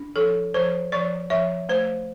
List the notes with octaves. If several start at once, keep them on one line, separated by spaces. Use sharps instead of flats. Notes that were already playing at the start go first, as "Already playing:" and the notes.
Already playing: D4
F3 A4
F3 C5
F3 D5
F3 E5
A3 C5